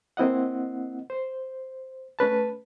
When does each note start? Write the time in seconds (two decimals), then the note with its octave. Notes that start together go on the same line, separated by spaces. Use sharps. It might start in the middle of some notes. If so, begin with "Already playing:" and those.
0.17 A#3 C4 E4 D#5 F#5
1.10 C5
2.19 A3 C#4 B4 A5